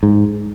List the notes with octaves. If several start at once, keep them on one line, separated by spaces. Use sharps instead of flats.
G#2